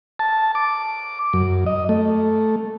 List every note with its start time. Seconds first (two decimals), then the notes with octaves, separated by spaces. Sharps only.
0.19 A5
0.55 D6
1.33 F#2
1.66 D#5
1.89 A3